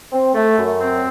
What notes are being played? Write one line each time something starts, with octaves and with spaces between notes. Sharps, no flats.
C4
A3
F#2
C4